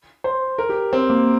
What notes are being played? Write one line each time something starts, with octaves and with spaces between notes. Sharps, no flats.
C5
A#4
G4
C4
A#3